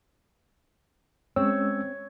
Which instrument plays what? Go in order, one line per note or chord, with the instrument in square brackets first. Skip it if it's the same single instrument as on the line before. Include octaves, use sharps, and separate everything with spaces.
[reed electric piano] G#3 C#4 E6 [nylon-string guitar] C4 [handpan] C#5